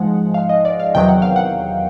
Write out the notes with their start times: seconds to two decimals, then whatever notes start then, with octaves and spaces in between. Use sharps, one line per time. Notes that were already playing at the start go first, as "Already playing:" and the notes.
Already playing: G#2 F3 G#3 F#5
0.34 F5
0.49 D#5
0.65 D5
0.80 F5
0.95 E2 C3 D#3 F#3 G5
1.08 F#5
1.22 F5
1.36 F#5